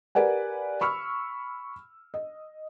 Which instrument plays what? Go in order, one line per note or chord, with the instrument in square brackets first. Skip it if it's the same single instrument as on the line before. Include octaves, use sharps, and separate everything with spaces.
[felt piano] G4 A#4 B4 D5 F#5 G#5
B5 C#6 E6 F6
D#5